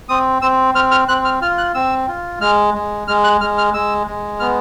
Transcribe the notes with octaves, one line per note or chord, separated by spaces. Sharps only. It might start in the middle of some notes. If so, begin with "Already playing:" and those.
C4 D#6
C4 E6
C4 F6
F6
C4 F#6
F6
F4 F6
F#6
C4 E6
F4
G#3 F6
G#3
G#3 F6
F#6
G#3 F6
F6
G#3 E6
G#3
B3 F6